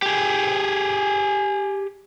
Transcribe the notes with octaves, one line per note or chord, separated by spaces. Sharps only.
G4 G#4